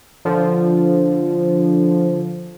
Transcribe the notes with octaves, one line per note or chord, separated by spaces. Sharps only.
D3 F3